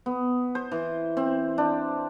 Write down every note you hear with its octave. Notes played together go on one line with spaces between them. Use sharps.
B3
C5
E3
C4
D4